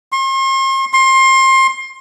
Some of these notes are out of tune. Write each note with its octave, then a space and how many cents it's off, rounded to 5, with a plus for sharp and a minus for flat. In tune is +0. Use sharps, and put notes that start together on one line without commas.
C6 +40
C6 +25